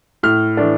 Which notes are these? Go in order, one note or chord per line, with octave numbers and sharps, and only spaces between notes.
A2 F6
E3 A3 D4